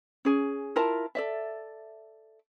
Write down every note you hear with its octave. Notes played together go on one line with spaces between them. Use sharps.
C#4 G#4
E4 F4 A#4 A5
A4 D5 E5